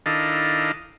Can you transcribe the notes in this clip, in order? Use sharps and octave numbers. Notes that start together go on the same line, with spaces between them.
D#3 D4 E4 A4 D#5 F5